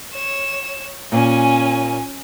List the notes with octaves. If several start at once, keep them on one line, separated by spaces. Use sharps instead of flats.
C#5 E7
A#2 C#4 G#5